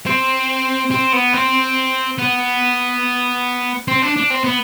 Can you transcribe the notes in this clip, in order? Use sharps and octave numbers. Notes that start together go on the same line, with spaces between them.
C4
C4
B3
C4
B3
C4
D4
D4
C4
B3